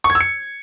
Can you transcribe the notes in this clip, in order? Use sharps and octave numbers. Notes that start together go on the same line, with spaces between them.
C#6
G#6
E6
C#7